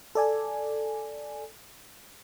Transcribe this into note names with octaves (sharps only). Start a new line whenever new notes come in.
A4 D5 G#5